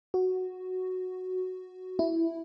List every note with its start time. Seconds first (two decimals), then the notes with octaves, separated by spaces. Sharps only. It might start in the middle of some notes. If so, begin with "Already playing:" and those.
0.14 F#4
1.99 E4